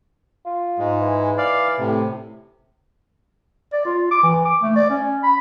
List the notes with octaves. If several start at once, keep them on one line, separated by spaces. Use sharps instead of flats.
F4
G#2 G#3
E3
D5 F5
A2 C3
D5
F4
D6
E3
D6
A3
D5
C#4
B5